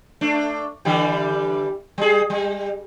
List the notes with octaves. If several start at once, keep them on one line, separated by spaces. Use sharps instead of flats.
A3 D4
D3 E3 G3
G3 G#4
G3